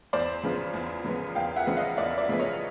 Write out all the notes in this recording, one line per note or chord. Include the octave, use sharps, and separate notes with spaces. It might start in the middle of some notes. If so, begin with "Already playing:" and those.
E2 C5 D5
C#3 F3 G#3 B3
E2
C#3 F3 G#3 B3
E2 F5 G5
E5 F#5
C#3 F3 G#3 B3
D#5 F5
E2 D5 E5
D5 E5
C#3 F3 G#3 B3
C#5 D#5